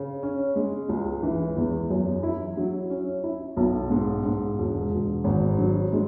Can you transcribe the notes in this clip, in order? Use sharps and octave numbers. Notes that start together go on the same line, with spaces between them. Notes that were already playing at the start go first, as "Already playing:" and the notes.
Already playing: C#3
C#4
G#3
C#2
E3
E2
F#2
E4
F#3
C#4
E4
B1
G#2
G#2
E1
E1
G#1
F#3
G#3